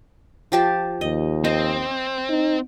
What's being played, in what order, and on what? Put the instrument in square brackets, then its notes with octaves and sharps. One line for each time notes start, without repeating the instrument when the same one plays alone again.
[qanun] F3 G4 A5
[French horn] D#2 [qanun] D#5
[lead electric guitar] C4 [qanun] D#5
[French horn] D#4